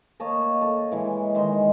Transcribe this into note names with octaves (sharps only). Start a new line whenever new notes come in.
A#3 C#5 D#5 A5
A4
E3 G#3
D#3 G#3 D#4 C6